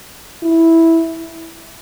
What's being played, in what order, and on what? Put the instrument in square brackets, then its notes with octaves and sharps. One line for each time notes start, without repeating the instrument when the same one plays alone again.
[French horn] E4